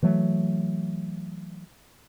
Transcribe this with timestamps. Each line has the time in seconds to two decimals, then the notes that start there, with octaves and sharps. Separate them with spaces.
0.03 E3 F#3 A3